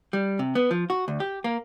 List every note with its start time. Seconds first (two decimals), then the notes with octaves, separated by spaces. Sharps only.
0.13 G3
0.39 C3
0.55 B3
0.71 F3
0.90 F#4
1.08 D2
1.20 G4
1.44 A#3